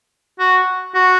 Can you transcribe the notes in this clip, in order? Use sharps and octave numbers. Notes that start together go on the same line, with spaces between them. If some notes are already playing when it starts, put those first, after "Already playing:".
F#4
F#4